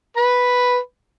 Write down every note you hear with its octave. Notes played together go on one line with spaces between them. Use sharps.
B4 B5